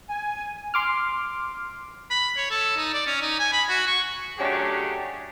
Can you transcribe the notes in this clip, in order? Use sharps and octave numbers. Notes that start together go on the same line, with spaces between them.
G#5
C6 D6 F6
B5
C#5
A4
D#4
D5
C#4
D#4
G#5
B5
F#4
C#6
F#3 A3 C#4 D4 G4 G#4